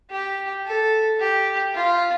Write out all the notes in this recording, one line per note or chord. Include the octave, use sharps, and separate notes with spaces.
G4
A4
G4
F4